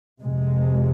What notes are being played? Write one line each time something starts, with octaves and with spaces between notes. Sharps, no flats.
F2 C3 G#3